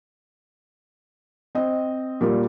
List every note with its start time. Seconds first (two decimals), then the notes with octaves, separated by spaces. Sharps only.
1.55 C4 D#5
2.21 A#2 G3 A#3